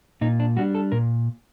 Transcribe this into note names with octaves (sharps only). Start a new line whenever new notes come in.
A#2 D#4
D4
G3 D4 F#4
A4
A#2 A#4